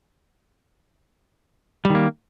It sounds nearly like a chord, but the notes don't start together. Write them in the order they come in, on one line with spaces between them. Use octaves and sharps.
G3 D#3 A#3